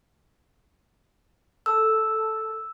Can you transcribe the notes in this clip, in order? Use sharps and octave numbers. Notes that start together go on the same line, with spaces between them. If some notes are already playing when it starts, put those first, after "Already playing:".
A4 E6